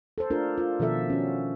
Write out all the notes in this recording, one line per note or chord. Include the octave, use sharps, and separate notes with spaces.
A4 C5
A3 D4 F4 A4 A#4
F4
B2 D#3 F3 A4 E5
C#4 F#4